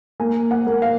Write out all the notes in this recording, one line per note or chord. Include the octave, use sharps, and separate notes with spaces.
A#3 G#5
F#5
A#3
F5